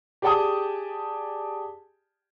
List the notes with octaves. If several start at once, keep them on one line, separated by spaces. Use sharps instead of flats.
G4 G#4 D5 G5 A5 D#6